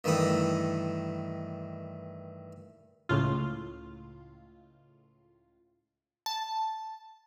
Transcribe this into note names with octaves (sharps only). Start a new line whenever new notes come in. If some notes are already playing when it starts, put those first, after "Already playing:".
G2 D#3 E3 A3 B5 D#6
C#2 A2 F4
A5